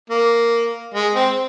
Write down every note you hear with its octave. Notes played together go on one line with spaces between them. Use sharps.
A#3
G#3
C4